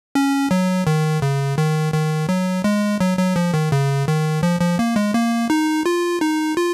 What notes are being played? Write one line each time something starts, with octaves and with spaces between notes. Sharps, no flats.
C#4
F#3
D#3
C#3
D#3
D#3
F#3
G#3
F#3
F#3
F3
D#3
C#3
D#3
F3
F3
A#3
G#3
A#3
D#4
F4
D#4
F4